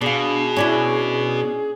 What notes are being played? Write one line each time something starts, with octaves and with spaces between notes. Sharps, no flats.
B2 D4 G#4 F5
C#4 D4 E4